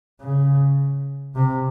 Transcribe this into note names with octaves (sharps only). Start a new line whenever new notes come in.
C#3
C3